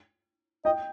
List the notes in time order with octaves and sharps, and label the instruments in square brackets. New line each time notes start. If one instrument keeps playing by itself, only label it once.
[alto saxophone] D#5 [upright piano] G5